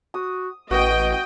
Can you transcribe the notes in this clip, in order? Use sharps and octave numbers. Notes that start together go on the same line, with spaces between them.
F#4 D#6
A1 B2 F#4 D#5 G5